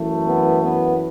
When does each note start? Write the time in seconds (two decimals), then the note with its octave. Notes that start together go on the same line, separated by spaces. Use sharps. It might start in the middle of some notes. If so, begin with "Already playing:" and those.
Already playing: F#2 E3 A3
0.25 B3
0.61 B3